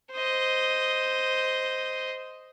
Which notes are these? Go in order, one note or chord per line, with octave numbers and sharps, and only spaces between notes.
C5 D#5